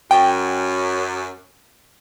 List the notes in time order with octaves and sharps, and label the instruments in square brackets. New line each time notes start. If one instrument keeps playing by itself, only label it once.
[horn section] F#2 [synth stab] G5